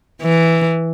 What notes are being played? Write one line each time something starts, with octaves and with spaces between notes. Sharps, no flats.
E3